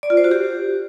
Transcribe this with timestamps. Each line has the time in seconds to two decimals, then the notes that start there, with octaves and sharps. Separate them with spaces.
0.03 D5
0.10 F4
0.17 C5
0.24 F#4
0.31 G4